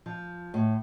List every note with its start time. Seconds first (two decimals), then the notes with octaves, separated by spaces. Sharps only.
0.06 F3
0.54 A2